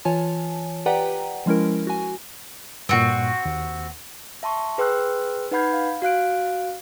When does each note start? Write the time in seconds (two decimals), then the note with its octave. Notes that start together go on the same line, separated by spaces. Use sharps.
0.05 E3 F4 C#5 G#5 A5
0.86 G4 B4 D5 F#5 G5 A#5
1.46 F3 G#3 C#4 E4 A#4
1.87 F#4 G#5
2.89 G2 A#2 C4 F#4
3.45 D#2
4.43 E5 A5 C6 C#6
4.78 G#4 B4 G5 C6 E6 F#6
5.51 D#4 B4 F#5 B5 G6 G#6
5.73 F5
6.02 F#4 F5 F#6 D7